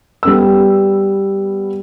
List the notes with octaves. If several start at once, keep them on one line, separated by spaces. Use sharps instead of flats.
G3 B3 E6